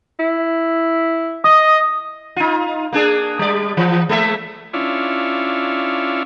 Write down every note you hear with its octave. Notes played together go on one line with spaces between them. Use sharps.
E4
D#5 D#6
D#4 F4
A#3 D4 G#4
G3 D5
E3
G#3 A#3 E5
C#4 D4 E4 F4